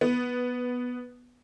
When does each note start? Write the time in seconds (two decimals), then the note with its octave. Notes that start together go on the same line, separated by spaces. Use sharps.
0.01 B3